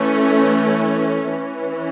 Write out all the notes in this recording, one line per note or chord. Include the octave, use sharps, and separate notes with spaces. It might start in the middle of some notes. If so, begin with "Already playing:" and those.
Already playing: E3 A3 C#4
E3 C#4